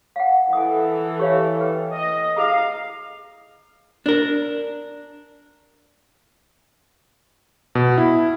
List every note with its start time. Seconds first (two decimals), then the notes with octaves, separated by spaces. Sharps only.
0.16 F5 F#5
0.53 E3 A4 G#5 D#6
1.19 G4 C#5 F5
1.61 B4 G5
1.94 D#5
2.36 E4 G#4 F5 A#5
4.06 D4 A#4
7.75 B2
7.98 E4